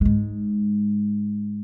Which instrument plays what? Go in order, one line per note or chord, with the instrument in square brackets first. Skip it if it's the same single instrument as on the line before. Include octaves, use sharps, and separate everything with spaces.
[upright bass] G#2 G#3